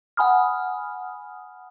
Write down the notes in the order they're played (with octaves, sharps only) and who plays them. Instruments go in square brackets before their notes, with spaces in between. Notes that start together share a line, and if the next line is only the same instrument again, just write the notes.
[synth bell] F#5 G#5 B5 D#6 F6